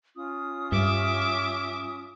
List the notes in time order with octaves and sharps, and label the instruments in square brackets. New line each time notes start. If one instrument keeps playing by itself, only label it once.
[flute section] C#4 F4 D#6
[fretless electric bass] G2 [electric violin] E5 D6